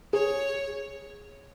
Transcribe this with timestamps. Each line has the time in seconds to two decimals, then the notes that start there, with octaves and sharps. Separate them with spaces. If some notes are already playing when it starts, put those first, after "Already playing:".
0.13 G#4 C#5